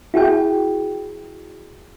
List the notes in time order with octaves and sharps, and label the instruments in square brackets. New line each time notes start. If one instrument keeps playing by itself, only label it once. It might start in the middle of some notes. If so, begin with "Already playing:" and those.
[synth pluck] E4 F#4 G#4 G5